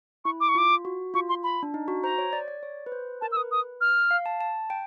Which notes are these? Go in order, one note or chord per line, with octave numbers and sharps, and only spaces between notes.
E4 C#6
D6
C#6
F4 D6
F#4
F4 C#6
C6
B5
D4
D#4
F#4
C5 A#5
C#5
D5
D5
C#5
B4
C5
A#4 A5
E6
B4 D#6
D#6
F6
F5
A5
A5
G5